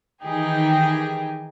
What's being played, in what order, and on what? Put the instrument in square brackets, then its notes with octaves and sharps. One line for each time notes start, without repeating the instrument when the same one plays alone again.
[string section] D#3 E3 D#4 G4 G#4